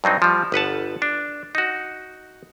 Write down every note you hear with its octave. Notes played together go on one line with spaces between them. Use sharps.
G2 F#3 C4 D#4
F3 G3
G1 B4 F#5 A5
D4
D#4 F#4